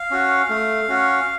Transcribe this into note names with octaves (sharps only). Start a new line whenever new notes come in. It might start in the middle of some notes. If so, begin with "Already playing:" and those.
Already playing: F5
C#4 F#4
A3
C#4 F#4